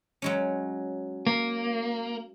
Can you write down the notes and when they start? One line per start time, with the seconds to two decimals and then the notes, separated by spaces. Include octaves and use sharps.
0.22 F#3 G#3 C#4
1.27 A#3